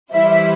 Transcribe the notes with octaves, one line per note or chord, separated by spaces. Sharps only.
E3 G3 E4 C5 E5
E5